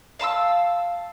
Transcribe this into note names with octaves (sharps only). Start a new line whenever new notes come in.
F5 A5 C6 E6